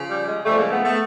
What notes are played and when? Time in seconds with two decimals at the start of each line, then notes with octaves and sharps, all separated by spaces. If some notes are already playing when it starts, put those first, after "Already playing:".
Already playing: C#3 F3
0.09 G3
0.27 G#3
0.45 C#3 F3 G3 A3
0.58 G#3 A#3
0.71 A3 B3
0.84 A3 B3